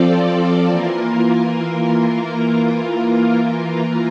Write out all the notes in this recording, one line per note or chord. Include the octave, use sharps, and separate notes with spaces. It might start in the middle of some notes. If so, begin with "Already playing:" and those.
Already playing: F3 C4 F4 A4 D5
E3 A#3 F4 A#4